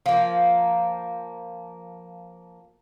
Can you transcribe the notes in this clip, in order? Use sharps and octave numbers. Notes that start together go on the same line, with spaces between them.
F3 A#3